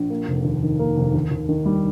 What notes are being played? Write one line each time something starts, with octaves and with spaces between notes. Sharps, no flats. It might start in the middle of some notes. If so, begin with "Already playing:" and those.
Already playing: A#1
A#3
F1
D#2
D#3
A#3
F1
D#2
D#2
D#3
G3